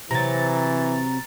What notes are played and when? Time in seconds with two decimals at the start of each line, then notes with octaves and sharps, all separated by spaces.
0.11 C3 E3 F#3 A#5 A6